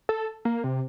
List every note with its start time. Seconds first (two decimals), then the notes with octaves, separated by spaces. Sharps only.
0.09 A4
0.45 A#3
0.64 C3